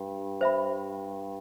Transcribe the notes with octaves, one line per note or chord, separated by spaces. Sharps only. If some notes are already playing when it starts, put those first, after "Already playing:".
Already playing: G2
C5 E5 B5